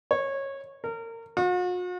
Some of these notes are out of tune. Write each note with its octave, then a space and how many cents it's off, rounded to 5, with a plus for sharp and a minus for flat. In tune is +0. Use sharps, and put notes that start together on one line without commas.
C#5 -20
A#4 -30
F#4 -45